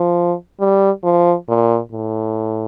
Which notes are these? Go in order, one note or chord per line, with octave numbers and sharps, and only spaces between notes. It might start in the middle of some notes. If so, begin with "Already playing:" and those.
Already playing: F3
G3
F3
A#2
A2